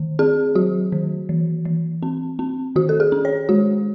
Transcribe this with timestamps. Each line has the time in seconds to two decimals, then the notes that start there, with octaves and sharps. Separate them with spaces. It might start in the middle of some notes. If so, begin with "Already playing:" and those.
Already playing: D#3
0.19 C4 G#4
0.55 F#3 F#4
0.92 D#3
1.29 E3
1.65 E3
2.03 C4
2.39 C4
2.76 D#3 F#4
2.89 A4
3.00 G#4
3.12 C#4
3.25 C#5
3.49 G#3 F#4